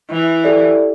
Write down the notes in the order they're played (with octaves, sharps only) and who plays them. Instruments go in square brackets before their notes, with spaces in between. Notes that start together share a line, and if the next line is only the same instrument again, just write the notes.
[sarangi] E3
[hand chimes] G4 A4 D5